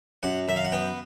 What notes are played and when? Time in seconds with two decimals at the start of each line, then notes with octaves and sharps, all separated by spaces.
0.23 F#2 F#5
0.48 F#2 E5
0.56 F5
0.64 F#5
0.72 B3 G5